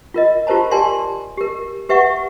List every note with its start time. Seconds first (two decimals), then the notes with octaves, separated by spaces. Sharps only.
0.14 F4 A#4 D#5
0.47 F4 G4 A#4 C5 A5 A#5
0.71 G4 A#4 D5 G#5 A5 C6
1.37 G4 A#4
1.89 G4 B4 E5 F#5 C#6